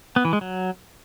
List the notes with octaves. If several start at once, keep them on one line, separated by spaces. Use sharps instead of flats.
B3
E3
G#3
F#3